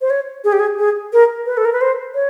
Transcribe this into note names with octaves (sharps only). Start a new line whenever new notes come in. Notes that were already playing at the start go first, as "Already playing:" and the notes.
C5
C#5
G#4
G4
G#4
G#4
A#4
B4
A4
A#4
B4
C5
C#5